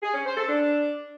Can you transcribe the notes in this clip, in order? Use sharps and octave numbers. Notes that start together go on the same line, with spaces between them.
G#4
C#4
C5
A4
D4